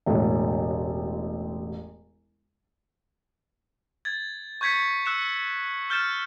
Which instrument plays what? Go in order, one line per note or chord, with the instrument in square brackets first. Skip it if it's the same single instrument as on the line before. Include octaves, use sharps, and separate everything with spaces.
[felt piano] E1 A1
[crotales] G#6 A6
C#6 G6 G#6 B6 C#7
E6 F#6 C#7 E7
F6 G6 A6 C#7 E7